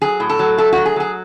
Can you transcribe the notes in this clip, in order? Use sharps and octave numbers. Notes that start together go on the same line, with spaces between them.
F#3 G#4
A2
A4
F#3
A3 A4
F#3 F#4
G#4
F#3 G#4